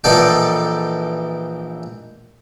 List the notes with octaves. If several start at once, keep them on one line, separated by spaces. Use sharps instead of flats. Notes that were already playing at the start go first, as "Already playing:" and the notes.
A#1 E3 D#4 A4 D5 G5